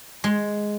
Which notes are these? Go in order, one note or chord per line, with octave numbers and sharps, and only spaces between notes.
G#3